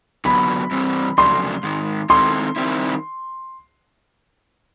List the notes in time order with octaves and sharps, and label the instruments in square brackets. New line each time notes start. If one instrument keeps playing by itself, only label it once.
[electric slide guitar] D3 F#3 B3 [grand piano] B5
[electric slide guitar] G2 E3 G3 C4
[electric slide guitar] F2 C#3 F#3 A3 D4 [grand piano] C6
[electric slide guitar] G#2 D#3 G#3
[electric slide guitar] D#3 G#3 C4 E4 A4 [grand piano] C6
[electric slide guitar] D#3 G3 C4 E4